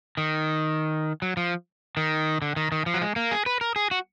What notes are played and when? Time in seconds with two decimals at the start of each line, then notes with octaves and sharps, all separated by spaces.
0.17 D#3
1.22 F#3
1.37 F3
1.97 D#3
2.42 D3
2.56 D#3
2.72 D#3
2.86 F3
2.94 F#3
3.02 G#3
3.16 A#3
3.31 G#4
3.46 B4
3.61 A#4
3.76 G#4
3.91 F#4